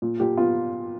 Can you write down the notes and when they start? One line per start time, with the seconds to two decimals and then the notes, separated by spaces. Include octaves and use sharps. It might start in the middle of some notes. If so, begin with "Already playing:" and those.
0.02 A#2
0.20 A#2 G4
0.37 B3 F4